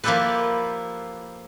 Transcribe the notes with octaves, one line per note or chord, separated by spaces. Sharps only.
F3 A#3 E4 G4 A4 B4